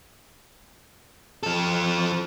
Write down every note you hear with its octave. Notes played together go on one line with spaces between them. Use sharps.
F3 A4